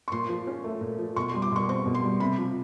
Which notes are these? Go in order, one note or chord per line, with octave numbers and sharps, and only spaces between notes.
C#6
A#2 C6
F3
C#4
A3
A#2
F3
B2 C#6
C6
G3
D6
B2 C#6
C4 C#6
B2
C6
G3
C3 B5
F3